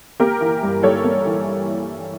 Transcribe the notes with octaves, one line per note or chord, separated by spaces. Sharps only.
A#3 G4 A#4
E3
G2
G3 A4 C#5
A#3
E3